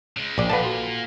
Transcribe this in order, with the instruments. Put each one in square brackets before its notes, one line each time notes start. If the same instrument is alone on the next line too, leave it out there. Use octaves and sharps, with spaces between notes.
[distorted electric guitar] C#3 G#3
[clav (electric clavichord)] A#1 D5 [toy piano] G5
[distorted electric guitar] A#2 [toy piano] A4 F5 F#5 [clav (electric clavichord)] B4 A5
[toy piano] F#4